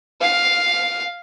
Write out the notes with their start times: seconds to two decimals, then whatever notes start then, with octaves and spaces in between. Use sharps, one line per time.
0.21 F5